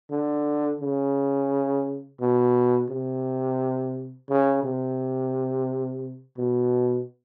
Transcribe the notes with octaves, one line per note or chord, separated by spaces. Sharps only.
D3
C#3
B2
C3
C#3
C3
B2